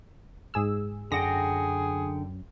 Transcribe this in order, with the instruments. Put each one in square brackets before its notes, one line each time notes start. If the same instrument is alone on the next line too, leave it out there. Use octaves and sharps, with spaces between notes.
[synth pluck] G#2 G#4 E6
[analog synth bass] F#2 [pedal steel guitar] D3 F#5 G5 [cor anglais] G#4 [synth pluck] A#6